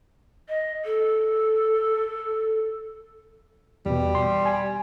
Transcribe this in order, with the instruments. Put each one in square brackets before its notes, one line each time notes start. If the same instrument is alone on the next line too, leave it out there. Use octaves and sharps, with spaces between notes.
[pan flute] D#5
A4
[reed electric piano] E2 B2 [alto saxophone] G3
[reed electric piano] C6
G#5